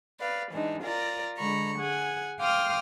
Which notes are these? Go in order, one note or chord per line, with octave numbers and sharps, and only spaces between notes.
B4 D5 F5
E3 G#3 D4 D#4
F4 A#4 D5 A#5
D3 G#3 A#5 B5 C#6
G#4 F#5 G#5
F5 G5 C6 D6 D#6 F6